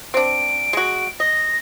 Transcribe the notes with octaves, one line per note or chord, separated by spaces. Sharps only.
C4 D4 D7
G#3 F#4
D#5 A#6